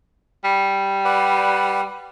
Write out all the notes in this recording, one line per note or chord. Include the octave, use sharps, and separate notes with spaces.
G3
B4 D5 F#5